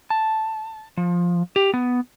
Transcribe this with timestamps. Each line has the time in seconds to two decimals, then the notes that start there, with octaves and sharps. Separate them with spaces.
0.10 A5
0.97 F3
1.56 G4
1.74 B3